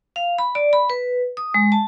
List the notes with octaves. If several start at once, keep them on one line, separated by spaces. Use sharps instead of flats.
F5
B5
D5
B5
B4
D#6
G#3
A5